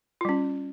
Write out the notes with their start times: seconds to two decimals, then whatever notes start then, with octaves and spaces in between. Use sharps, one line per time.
0.21 F4
0.25 G3
0.29 C#4